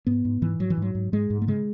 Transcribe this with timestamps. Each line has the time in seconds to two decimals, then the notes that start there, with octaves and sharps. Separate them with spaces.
0.07 G#2 B3
0.25 G#2
0.42 G#2 E3
0.59 G#2 F#3
0.70 E3
0.77 G#2 F#3
0.95 G#2
1.12 G#2 G#3
1.30 G#2
1.42 A3
1.47 C#3 G#3